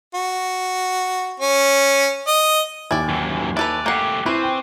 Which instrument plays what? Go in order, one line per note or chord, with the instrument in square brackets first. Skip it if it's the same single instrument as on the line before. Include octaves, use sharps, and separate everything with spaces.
[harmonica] F#4
C#4
D#5
[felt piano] D#2 [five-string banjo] E4 D5 [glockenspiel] G#5
[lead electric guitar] F#2 E3
[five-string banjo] E4 A4 B4 [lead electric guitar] D5 [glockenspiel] F#6 D#7 F7
[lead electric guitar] A3 G4 [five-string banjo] A#3 F#5 [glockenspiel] D6 C7
[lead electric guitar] C4 [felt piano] E4 [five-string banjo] B4 [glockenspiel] C#6 D#7
[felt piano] G5